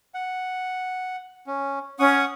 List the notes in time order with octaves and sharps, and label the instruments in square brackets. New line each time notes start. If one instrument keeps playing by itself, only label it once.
[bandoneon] F#5
C#4
[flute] C#4 [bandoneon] F#5 C#6 D#6